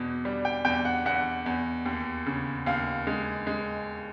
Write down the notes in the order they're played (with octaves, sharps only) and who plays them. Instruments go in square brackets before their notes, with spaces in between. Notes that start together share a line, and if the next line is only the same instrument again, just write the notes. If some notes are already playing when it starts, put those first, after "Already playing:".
Already playing: [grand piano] E2 B2
G3
G5
E2 G5
F#5
E2 F#5
E2
D#2
C#3
D#2 F5
G#3
G#3